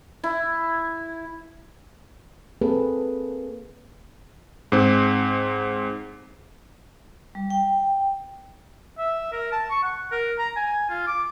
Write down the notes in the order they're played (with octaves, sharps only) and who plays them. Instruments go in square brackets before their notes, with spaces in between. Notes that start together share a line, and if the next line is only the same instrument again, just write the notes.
[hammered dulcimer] E4
[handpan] A#3 C4 G#4 A4 B4
[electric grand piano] G#2 C4
[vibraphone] G3
G5
[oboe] E5
A#4
A5
C#6
F#5
A#4
A#5
G#5
F4
D6